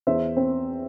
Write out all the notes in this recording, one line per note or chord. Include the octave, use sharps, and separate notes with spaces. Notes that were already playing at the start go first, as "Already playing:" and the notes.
E2 C5 E5
C4